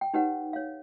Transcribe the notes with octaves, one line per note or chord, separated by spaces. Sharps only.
G5
D#4 G4 B4 C#5 F#5
C#5 F5